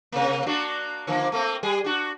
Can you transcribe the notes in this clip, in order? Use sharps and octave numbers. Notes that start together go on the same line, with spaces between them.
C3 A#3
A#3 D4 F#4
D3 F3 A#3
A3 A#3 C4
G3 G#4
D4 F#4